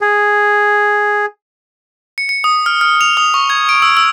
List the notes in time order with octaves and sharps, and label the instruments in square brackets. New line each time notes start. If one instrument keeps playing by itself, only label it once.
[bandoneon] G#4
[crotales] C#7
C#7
D#6
F6
F6
F7
D#6
C#6
G#6
D7
E6
E6